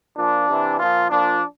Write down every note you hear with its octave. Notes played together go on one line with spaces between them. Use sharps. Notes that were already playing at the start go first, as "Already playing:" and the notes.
A#2 F3 D4
C3 E3
A#2 F3 F4
A#2 F3 D4